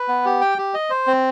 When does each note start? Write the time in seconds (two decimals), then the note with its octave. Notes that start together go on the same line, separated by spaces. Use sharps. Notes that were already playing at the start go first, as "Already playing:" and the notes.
Already playing: B4
0.08 B3
0.25 G4
0.41 G5
0.58 G4
0.74 D#5
0.90 C5
1.07 C4